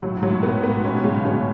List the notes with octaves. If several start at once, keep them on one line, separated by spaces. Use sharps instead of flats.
A2 F#3
G#2
F#3
A2
A2 B3
G#2
B3
G#2
A2 C#4
G#2 B2
A2 C#3
A2
B2 D3 C#4